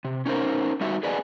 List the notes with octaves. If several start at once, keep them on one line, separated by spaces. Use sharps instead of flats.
C3
C#4 D#4 A#4 C5
G3 D#4 F#4 E5
G#4 B4 D5 D#5 G#5